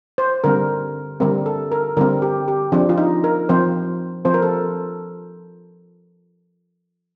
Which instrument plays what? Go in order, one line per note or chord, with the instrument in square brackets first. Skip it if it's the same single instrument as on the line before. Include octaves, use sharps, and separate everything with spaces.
[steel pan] C5
D3 G3 C4 A#4
D3 G3 C4 A#4
A4
A#4
D3 G3 C4 A#4
G4
G4
F3 C4 D4
F4
D#4
A#4
F3 C4 C5
F3 C4 C5
A#4
A4